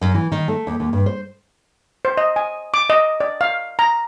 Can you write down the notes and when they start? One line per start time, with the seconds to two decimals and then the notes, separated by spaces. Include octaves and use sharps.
0.01 F#2
0.14 E3
0.32 D#3
0.48 A3
0.67 D#2
0.80 D#2
0.93 G2
1.06 C5
2.05 C5
2.17 D#5
2.36 G#5
2.74 D6
2.90 D#5
3.20 D5
3.41 F5
3.79 A#5